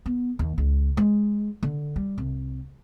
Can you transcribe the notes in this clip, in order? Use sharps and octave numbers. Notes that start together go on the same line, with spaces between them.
B3
D#2
C#2
G#3
D3
G3
C2